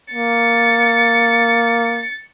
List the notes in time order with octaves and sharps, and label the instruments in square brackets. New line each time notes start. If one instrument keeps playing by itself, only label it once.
[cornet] A#3 [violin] A6 C#7